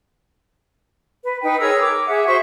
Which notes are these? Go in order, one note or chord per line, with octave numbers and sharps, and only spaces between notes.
B4
D#4 B4 G5
G#4 A#4 C#5 E6
D6
G#4 E5 F#5
F#4 C5 E5 C#6